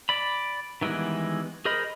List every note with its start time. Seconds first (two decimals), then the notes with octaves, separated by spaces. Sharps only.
0.09 D5 B5
0.81 D#3 E3 G3 G#3 B3
1.65 G#4 A#4 C5 D#5 B5